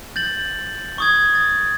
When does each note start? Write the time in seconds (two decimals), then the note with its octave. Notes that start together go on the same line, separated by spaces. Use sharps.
0.16 G6 A6 F#7
0.98 C#6 D#6 G#6
1.34 D#6 A6